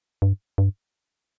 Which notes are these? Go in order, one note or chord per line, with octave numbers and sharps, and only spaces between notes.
G2
G2